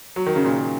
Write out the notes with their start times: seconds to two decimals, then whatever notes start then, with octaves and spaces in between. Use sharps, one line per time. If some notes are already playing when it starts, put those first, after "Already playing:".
0.16 F#3
0.26 D#3
0.36 C#3
0.45 A#2